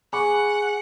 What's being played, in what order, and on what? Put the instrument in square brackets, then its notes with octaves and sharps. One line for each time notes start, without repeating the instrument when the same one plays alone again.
[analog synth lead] G#4 [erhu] F#5 [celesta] G#5 [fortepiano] B5 C#6 D6